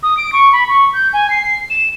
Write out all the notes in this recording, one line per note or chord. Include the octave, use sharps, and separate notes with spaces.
D#6
D7
C#6
B5
C#6
G6
G#5
C7
E7